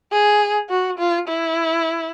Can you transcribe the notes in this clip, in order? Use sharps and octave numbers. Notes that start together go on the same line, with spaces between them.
G#4
F#4
F4
E4